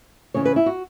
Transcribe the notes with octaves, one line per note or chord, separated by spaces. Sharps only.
C#3 E3 C#4 C#5
B4
E4
F#4